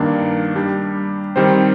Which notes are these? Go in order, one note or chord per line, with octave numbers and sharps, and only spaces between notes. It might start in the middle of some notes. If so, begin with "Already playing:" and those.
Already playing: G2 D#3 A#3 D4
G3 D4 G4
D#3 G3 C4 G4 C5